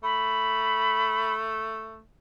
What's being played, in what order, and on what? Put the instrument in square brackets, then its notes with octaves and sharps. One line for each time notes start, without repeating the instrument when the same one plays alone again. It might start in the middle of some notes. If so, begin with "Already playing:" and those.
[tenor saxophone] A3 [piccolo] B5